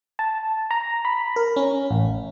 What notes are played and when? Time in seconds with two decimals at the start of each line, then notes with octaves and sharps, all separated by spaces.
0.19 A5
0.71 A#5
1.05 B5
1.36 A#4
1.56 C#4
1.91 A1